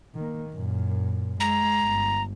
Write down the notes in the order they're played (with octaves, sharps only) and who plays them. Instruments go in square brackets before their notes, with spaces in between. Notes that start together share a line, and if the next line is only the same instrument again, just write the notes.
[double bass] D#3 A#3
F#2 A#2
[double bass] G#3 [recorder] A#5
[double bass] G1